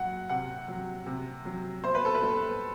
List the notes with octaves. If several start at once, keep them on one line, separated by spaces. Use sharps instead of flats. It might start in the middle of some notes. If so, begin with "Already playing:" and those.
Already playing: F#3 F#5
C3 F#5
F#3
C3
F#3
B2 C5
B4
A4
B4
G3